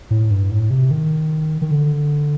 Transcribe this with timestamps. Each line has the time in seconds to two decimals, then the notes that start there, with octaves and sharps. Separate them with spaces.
0.11 A2
0.31 G2
0.51 A2
0.70 C3
0.91 D#3
1.62 D#3
1.71 D3